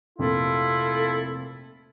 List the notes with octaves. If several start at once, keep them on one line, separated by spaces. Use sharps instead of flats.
F1 F2 A#2 E4 F4 A4